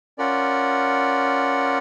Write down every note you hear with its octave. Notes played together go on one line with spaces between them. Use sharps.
C#4 F4 A#4 D5 F#5